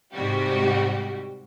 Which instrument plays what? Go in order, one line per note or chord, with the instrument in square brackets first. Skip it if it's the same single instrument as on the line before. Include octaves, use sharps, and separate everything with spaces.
[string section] G#2 C3 G3 F#4 G4